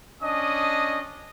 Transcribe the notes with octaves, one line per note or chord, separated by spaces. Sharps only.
C#4 D4 D#5 D#6